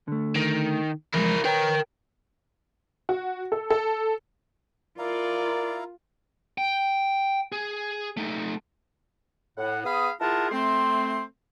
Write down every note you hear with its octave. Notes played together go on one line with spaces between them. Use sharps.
D3 A3
D#3
E2 F3 G#3 E4 A#4
A#4 B4 C#5 G5 A#5
F#4
A4
A4
E4 F4 A#4 D5 F5 A#5
G5
G#4
A3 D#4
A2 F#5
B3 G#4 F5 B5 D#6
E4 F4 G#4 A#4 F#5 A5
A3 C4 C6